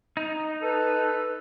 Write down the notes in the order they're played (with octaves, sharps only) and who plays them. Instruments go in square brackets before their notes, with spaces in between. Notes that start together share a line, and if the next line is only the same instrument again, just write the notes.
[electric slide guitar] D#4
[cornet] A4 [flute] B4